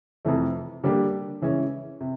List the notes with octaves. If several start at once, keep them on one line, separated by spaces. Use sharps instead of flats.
F2 C3 E3 A3
D3 G3 A#3 D4 G4
C#3 E3 G#3 C#4 E4
C3